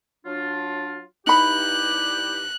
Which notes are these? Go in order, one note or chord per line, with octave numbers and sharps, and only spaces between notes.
F#3 D4 F4
G2 D#4 E4 G4 B5 F#6